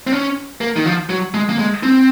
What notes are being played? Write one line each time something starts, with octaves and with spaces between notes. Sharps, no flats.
C4
C#4
A#3
D#3
F3
F#3
G#3
A#3
G#3
C4